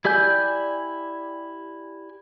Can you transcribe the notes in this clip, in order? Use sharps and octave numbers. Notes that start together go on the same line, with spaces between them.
E4 G4 D5 G#5 G6